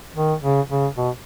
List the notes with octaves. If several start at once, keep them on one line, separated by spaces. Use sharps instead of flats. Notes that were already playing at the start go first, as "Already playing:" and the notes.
D#3
C#3
C#3
B2